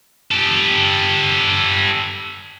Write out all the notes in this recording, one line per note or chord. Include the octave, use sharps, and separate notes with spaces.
G4 A4